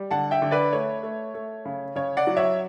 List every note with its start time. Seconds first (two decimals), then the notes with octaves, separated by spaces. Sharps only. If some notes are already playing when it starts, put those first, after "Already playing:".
Already playing: G3
0.11 D3 F#5 A5
0.31 E5 G5
0.42 D3
0.51 B4 D5
0.73 A3 C#5
1.03 A3
1.34 A3
1.65 C#3
1.95 C#3 C#5
2.17 D5 F#5
2.27 F#3
2.37 C#5 E5